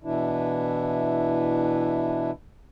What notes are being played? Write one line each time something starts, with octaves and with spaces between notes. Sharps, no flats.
B2 E3 D4 E4